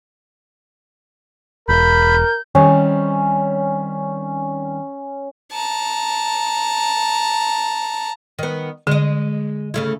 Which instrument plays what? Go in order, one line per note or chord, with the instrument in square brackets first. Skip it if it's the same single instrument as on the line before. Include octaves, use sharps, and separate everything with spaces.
[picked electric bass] E1 [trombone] A#4 [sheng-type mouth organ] B5 [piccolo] G6
[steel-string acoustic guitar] D#3 G3 C4 [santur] C#4
[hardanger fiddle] A5 A#5
[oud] D#3 B3
[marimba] D3 [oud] G#3 D#5
[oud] C#3 A3 E4